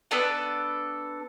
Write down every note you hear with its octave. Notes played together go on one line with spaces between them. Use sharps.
B3 D4 A4 F#5